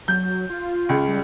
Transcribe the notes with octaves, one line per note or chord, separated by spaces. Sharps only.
F#3 G6
F4
C#2
G3